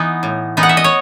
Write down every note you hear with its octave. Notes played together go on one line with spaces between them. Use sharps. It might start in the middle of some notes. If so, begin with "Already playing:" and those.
Already playing: E3 B3 D#4
A2
E3 B3 D#4
F#5
E5
D#5
C#5